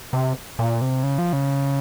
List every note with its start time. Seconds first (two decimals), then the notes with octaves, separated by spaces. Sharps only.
0.13 C3
0.59 A#2
0.81 C3
1.03 C#3
1.18 F3
1.33 C#3